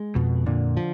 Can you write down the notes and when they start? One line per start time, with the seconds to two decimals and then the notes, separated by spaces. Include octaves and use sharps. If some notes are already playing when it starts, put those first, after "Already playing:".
Already playing: G#3
0.15 F2 B2
0.46 A#2 D3
0.77 F3